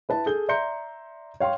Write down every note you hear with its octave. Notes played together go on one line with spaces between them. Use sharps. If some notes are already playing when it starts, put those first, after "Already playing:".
E4 B4 A5
G#4 A4 G6 G7
D5 E5 A#5 C6 G6 C#7
C#5 F5 G5 C6